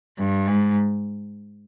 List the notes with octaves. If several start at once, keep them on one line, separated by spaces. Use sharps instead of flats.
G2
G#2